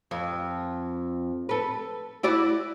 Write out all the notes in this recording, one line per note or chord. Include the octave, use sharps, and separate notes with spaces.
F2
A4 B4
E4 F#4 D5